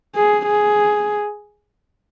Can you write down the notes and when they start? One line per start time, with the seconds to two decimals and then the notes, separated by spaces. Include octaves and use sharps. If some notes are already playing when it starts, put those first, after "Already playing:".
0.15 G#4
0.46 G#4